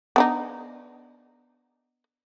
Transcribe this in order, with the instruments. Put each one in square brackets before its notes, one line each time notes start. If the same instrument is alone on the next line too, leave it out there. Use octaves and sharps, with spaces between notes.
[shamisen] B3 D4 D#4